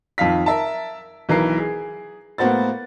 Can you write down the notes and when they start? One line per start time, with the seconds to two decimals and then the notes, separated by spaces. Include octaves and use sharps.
0.18 F2 D#3 F5 B6
0.46 A#4 E5 A5
1.29 B1 E3 D#4 A#4 C7
1.58 G#4
2.38 A2 A#3 B3 F#4 C5 A6